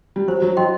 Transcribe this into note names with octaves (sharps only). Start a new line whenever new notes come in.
G3
F#3 C5
F#3
F#3 D#5 G5 C6